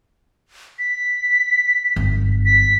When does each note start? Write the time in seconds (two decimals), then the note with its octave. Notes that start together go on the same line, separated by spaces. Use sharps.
0.79 B6
1.96 G1 F#2
2.46 B6